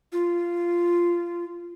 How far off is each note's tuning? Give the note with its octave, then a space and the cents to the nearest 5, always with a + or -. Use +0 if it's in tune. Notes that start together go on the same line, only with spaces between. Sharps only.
F4 -10